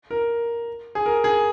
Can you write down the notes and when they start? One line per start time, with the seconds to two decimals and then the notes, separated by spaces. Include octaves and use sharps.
0.11 A#4
0.95 G#4
1.06 A#4
1.24 G#4